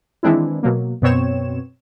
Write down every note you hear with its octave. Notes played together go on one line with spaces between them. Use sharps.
D#3 E3 G#3 C4 D4 E4
B2 F#3 A#3
F#2 B2 B3 C4 C#5 E7